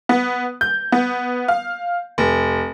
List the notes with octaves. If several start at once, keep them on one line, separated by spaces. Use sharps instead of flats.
B3
G6
B3
F5
F1